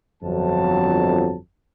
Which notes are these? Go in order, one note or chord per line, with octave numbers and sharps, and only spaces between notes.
G1 F2 F#3 A5